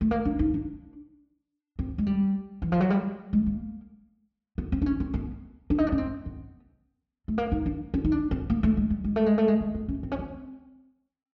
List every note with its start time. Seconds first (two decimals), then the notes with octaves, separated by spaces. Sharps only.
0.01 A3
0.11 A#3
0.25 D4
0.39 D#4
0.54 D4
1.79 C4
1.98 G#3
2.07 G3
2.62 E3
2.72 F3
2.80 F#3
2.90 G3
3.33 G#3
3.46 A#3
4.58 B3
4.72 C4
4.82 D4
4.86 C#4
5.00 C4
5.14 B3
5.70 D4
5.78 D#4
5.87 D4
5.92 C#4
5.98 C4
6.26 B3
7.28 A3
7.38 A#3
7.52 D#4
7.66 D4
7.94 C#4
8.05 D#4
8.12 D4
8.31 C4
8.50 A#3
8.63 A3
8.77 G#3
8.90 G3
9.04 G#3
9.16 A3
9.26 G#3
9.38 A3
9.48 G#3
9.61 A#3
9.74 B3
9.88 C#4
10.03 C4
10.12 C#4
10.19 C4